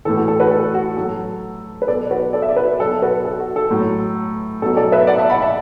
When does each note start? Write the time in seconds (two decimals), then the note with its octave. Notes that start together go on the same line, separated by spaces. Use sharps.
0.05 A2 E3 A4
0.17 F#4
0.28 A4
0.40 F#4 B4
0.51 A4
0.74 F#4
0.97 A2 F#3 A4
1.82 B4
1.88 B2 F#3 A4 D5
2.11 F#4 B4
2.33 A4 D5
2.42 E5
2.49 D5
2.56 F#4 B4
2.79 F#3 A4 D5
2.83 B2
2.91 A4
3.02 F#4 B4
3.25 A4
3.40 F#4
3.56 A4
3.70 A2 F#3
4.62 B2 F#3 A4
4.77 A4 D5
4.92 B4 E5
5.07 D5 F#5
5.18 E5 A5
5.30 F#5 B5
5.41 E5 A5